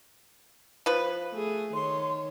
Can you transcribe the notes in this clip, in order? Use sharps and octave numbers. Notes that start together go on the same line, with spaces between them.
F3 B4
A3 G#4
D#3 C#5 C6